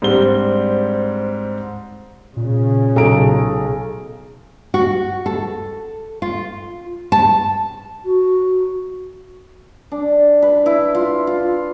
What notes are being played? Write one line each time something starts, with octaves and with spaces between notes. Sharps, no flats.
G#2 G3 C4 D4 G7
A#2 C#3
B1 G#4 A4 A#5 D7
F#4
A4
F4
A5
F#4
D4
B4
E4
F4
F4